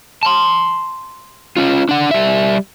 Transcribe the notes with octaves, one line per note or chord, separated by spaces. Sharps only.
A5 C6
C#4 F4
D4 F#5
G3 E5